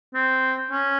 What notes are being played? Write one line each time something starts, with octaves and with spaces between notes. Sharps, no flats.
C4
C#4